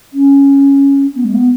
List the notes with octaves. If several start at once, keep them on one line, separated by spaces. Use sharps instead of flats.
C#4
B3
G#3
B3